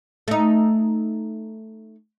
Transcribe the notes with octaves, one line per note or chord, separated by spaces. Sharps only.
A3 D#4